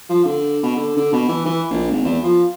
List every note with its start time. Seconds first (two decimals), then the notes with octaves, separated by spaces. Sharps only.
0.09 F3
0.25 D3
0.63 B2
0.76 D3
0.97 D3
1.12 B2
1.29 E3
1.46 E3
1.71 A#1
1.92 G#1
2.05 E2
2.23 F3